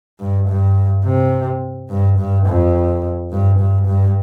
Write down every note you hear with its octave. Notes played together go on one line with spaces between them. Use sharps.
G2
G2
C3
G2
G2
F2
G2
G2
G2